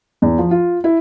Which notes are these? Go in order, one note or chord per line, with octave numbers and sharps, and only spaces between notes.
E2
F3
F4
E4